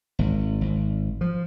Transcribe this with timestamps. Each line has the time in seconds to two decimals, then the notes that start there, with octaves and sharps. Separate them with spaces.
0.19 G#1
0.61 G#1
1.21 F3